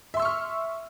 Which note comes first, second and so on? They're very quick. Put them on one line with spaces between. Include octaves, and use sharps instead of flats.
E5 C6 E6 C#6 F6